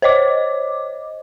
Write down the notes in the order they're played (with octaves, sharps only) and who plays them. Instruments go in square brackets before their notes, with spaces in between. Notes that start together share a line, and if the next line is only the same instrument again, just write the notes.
[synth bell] C5 C#5 D#5 D6